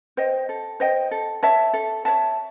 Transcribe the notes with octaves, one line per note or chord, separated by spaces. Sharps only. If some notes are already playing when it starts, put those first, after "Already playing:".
C5 D#5 G5
A4
C5 D#5 G5
A4
C#5 E5 A5
A4
C#5 E5 A5